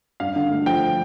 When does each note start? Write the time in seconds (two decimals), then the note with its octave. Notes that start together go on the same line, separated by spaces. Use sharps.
0.20 G2 F5
0.36 D3
0.51 A3
0.66 F3 G5